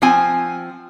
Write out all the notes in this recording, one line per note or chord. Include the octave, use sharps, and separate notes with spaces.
F3 C4 G#5